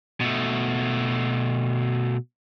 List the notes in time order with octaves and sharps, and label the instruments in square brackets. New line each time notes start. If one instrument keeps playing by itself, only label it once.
[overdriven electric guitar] B2 A3